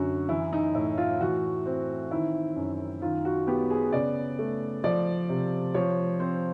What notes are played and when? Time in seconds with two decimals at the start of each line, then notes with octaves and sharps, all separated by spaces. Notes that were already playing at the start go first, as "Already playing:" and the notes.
Already playing: F#2 D3 F#4
0.29 E3 E4
0.53 D#4
0.74 A2 E4
0.98 F4
1.20 E3 F#4
1.66 C4
2.11 D#3 E4
2.56 F#2
3.02 D#3 F4
3.25 F#4
3.47 B3 G4
3.70 G#4
3.92 C#3 D5
4.39 A3
4.84 F3 D5
5.29 C3
5.74 F3 C#5
6.20 C4 C5